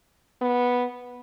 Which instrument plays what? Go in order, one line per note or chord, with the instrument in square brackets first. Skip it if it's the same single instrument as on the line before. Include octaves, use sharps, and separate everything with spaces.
[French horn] B3